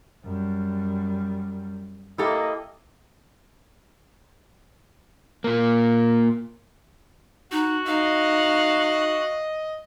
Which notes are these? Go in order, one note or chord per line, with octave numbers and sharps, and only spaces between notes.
F#2 G3
A#3 E4 G4 A4 D#5
A#2 A#3
D#4 F#4 F#5
D#4 D#5 F5